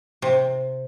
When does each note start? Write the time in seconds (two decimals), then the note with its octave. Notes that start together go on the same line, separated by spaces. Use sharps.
0.22 C3